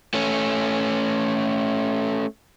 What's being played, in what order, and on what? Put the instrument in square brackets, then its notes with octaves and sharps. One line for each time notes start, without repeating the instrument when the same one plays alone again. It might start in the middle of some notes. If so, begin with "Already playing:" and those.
[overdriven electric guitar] A3 C#4